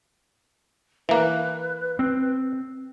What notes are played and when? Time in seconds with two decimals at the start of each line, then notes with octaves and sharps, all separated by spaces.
1.09 E3 A#3 B4
1.99 C4